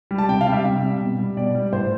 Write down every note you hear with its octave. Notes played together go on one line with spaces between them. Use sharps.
G3
A5
C3 G5
F5
G3
E5
C3
G3
B2
G3
B2 D5
G3
A2 C5